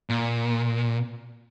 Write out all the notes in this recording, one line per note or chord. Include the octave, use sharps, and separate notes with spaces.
A#2